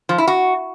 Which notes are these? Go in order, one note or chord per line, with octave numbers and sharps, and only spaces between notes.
F3
E4
F#4